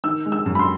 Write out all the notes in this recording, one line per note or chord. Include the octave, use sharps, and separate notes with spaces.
D#3 E6
G#3
E6
F#2
B5
C6